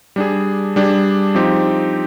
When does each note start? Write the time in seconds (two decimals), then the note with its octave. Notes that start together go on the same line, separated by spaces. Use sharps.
0.16 G3 D4 G#4
0.76 G3 D4 G#4
1.35 F3 C4 D#4 G4